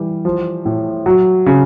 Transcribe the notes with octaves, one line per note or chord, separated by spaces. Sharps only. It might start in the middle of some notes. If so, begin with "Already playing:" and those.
Already playing: E3 G3
F3
A2
F#3
C#3